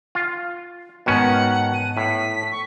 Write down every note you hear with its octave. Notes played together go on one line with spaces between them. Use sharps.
F4
G#2 B2 D#3 B3 C#4 F#5 A5
D#7
A2 B6
C#6